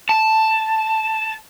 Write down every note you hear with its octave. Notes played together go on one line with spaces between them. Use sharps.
A5